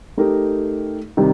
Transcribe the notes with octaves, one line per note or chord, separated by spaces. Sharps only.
A3 D#4 G4 A#4
C3 D#3 G3